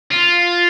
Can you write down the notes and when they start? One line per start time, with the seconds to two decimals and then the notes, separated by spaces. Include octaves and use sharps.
0.11 F4